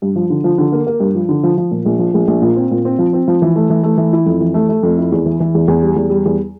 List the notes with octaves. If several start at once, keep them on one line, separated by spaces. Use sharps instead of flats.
G2
F3
D3
F3
D3
A#3
A#3
G2
F3
D3
F3
F3
A#2
A#1
F3
A#1
A#1
A#2
C4
A#2
C4
F3
C4
F3
E3
A3
E3
A3
E3
E4
F2
E3
A3
A3
F2
E4
E2
E3
E3
E2
E2
G3
E2
G3
E2